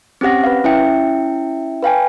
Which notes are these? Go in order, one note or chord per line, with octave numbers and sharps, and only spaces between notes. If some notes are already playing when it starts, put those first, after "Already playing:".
C4 C#4 G4 F#5 A#6
B4 F5
C#4 E4 E5 G5 C#7
B4 F5 G5 G#5